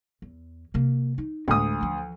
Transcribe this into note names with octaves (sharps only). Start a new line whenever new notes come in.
E2
C3 A#3
D#4
D2 A2 G#3 D#6
E3 F3